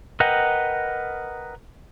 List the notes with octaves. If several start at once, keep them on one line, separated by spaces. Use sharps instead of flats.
A#4 B4 D#5 F#5 G5